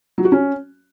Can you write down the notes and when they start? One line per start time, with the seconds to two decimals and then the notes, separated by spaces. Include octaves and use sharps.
0.18 F#3
0.25 F#4
0.32 C#4